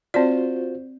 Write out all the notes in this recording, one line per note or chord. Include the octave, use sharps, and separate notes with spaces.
C4 F4 F#4 C5 D5